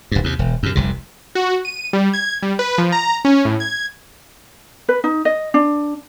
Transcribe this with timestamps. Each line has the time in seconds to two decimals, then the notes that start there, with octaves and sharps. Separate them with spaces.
0.12 D#1 G2
0.24 D#2 C3
0.39 E1
0.63 F#2 C3
0.75 F1 C2 C3
1.35 F#4
1.65 D#7
1.93 G3
2.13 G#6
2.43 G3
2.59 B4
2.78 F3
2.92 A#5
3.25 C#4
3.45 A2
3.60 G#6
4.89 B4
5.04 D#4
5.25 D#5
5.54 D4